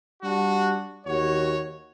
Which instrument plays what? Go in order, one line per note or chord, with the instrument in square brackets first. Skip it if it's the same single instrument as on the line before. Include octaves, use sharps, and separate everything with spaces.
[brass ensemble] G3 D4 F#4
D#2 F#4 C#5